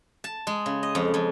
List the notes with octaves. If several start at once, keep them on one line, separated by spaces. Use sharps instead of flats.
A5
G#3
C#3
D#5
F2
F2